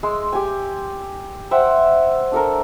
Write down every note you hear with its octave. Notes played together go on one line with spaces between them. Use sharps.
G#3 C6 E6
G4 G#5
C5 E5 F#5 G5
D4 A4 A#4